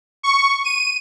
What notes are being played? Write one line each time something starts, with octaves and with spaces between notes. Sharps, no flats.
C#6
D#7